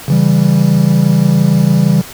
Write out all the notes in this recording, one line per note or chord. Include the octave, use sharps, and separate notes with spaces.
C#3 E3 G3